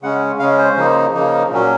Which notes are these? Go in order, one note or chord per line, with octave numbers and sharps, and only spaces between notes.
C#3 G#3 C#4 F#5
C#3 G#3 C#4 F5
C5
C#3 F3 A#3 D#4
C#3 F3 A#3 D#4
A#2 F#3 C#4